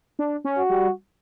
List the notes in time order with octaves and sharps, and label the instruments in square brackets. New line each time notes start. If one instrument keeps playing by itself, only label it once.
[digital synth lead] D4
C#4
[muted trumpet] F#4
[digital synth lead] G3